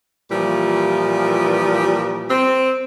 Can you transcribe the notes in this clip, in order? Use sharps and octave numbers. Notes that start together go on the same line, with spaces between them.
A#2 E3 F3 G3
C4